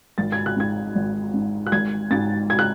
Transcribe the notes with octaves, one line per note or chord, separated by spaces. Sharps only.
G#1 A6
G#6
F#6
G#2 G#6
G#1
G#2
F#6
G#1 G#6
G#2 A6
G#6
F#6